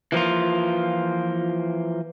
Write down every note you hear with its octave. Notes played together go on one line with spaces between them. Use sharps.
E3 F3 A#3 F4